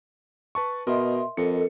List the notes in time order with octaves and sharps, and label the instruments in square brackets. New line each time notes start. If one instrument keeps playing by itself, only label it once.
[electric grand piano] B4 A5 C#6
[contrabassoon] B2 [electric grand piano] A#4 D#5 [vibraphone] E5 C6
[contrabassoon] F2 [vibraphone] A4 A#4 D#5 [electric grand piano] C#7